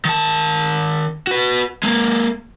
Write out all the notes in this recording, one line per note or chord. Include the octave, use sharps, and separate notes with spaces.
D#3 A5
F#4 B4
G#3 A#3